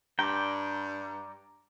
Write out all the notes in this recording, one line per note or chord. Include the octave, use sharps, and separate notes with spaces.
G2 D5 G5 A#5